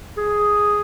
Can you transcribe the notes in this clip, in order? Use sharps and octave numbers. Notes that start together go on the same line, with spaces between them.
G#4